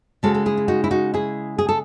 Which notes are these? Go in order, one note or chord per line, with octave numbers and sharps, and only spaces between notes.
C#3 G#3 C#4 F#4 A4
A4
E4 G#4
E4
D#4 F#4
E4
D#4 F#4
E4 G#4
G#4
A4